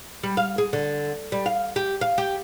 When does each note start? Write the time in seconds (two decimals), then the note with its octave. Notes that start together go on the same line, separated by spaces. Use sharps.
0.23 G3
0.37 F5
0.58 G#4
0.73 D3
1.32 G3
1.46 F5
1.76 G4
2.01 F5
2.18 G4